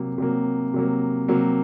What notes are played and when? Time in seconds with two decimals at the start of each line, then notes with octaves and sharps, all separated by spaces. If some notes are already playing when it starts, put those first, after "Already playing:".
Already playing: C3 F#3 A#3
0.18 C3 F#3 A#3
0.74 C3 F#3 A#3
1.28 C3 F#3 A#3